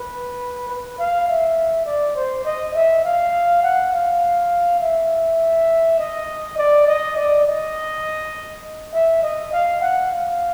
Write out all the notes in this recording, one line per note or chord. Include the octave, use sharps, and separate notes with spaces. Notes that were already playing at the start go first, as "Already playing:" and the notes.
Already playing: B4
B4
F5
E5
D5
C5
D#5
E5
F5
F#5
F5
E5
D#5
D5
D#5
D5
D#5
E5
D#5
F5
F#5
F5